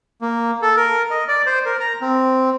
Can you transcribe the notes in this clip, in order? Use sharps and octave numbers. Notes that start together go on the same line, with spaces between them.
A#3
A4
A#4
D#5
D5
C5
A#4
A#5
C4